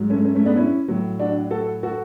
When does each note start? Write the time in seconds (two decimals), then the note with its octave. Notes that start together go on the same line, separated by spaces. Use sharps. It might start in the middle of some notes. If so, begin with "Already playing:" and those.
Already playing: G#2 F#3
0.10 A3 C#4
0.25 A3 C#4
0.35 A3 C#4
0.46 B3 D4
0.56 C#4 E4
0.88 A2 F#3
1.19 D4 F#4
1.50 F#4 A4
1.83 F#4 A4